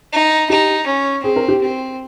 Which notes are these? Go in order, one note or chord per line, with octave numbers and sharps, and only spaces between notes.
D#4
D#4 G4
C#4
C4 G#4
A#4
G4
C4